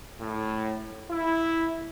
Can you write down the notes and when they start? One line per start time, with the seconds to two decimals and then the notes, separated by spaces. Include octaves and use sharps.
0.21 A2
1.10 E4